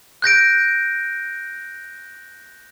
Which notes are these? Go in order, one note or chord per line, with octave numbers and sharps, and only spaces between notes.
F#6 G6 A#6 D7